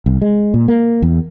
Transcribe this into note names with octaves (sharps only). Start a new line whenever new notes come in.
C2
G#3
A#2
A#3
E2